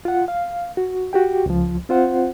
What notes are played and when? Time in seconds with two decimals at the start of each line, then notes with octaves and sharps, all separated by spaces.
0.05 F4 F#5
0.28 F5
0.77 F#4
1.13 F#4 G4 G5
1.46 C#2 F3
1.89 C4 F4 C5 F#5